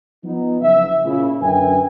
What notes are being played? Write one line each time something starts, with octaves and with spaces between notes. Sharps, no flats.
F3 B3 D#4
F#1 E5
A#2 C#3 E4
F#2 D3 B4 E5 G5 G#5